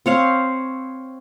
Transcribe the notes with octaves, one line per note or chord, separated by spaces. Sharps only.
C4 C#5 F5